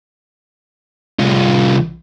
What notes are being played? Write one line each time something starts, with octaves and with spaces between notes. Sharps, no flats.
C2 F4